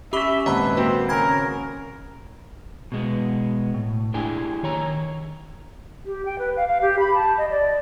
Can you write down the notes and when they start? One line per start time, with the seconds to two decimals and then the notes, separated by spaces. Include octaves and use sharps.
0.13 C#4 G4 E5 B5 C#6 D6 B6 G7
0.46 G#1 F2 A#2 B4 D#5 A5 E6
0.77 A#3 C4 F#4 B4
1.09 C#3 A#4 G#5 B5 G#6
2.92 B2 G#3 B3
3.74 A2
4.14 D4 E4 G4 G#4 G#5
4.63 D#3 C#5 A#5
6.06 G4
6.25 G5
6.39 B4
6.56 F5
6.68 F5
6.81 G4
6.99 B5
7.14 A5
7.38 D#5
7.50 D5